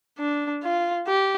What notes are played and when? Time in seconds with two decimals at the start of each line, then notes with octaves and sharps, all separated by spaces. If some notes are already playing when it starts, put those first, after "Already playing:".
0.18 D4
0.63 F4
1.07 G4